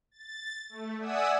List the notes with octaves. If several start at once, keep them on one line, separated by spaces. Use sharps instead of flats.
A6
A3
D5 E5 F#5 G#5 D#6 E6